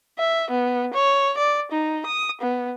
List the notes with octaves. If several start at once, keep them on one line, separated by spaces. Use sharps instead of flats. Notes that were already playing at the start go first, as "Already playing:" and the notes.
E5
B3
C#5
D5
D#4
D#6
B3